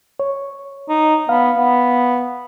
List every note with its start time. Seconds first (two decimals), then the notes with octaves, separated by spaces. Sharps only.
0.20 C#5
0.89 D#4
1.29 B3 F5
1.56 B3